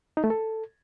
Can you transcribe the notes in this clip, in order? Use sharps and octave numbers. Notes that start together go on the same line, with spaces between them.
D#4
A3
A4